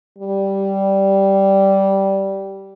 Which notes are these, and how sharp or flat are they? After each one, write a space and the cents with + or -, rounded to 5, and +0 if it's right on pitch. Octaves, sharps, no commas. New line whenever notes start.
G3 -10